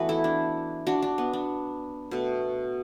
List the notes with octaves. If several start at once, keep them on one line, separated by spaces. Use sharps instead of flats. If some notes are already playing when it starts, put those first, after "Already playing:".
Already playing: E3 A3 B3 F#4 B4
E4 A4
D4
D4 F#4
D4
B3
D4
B2 A3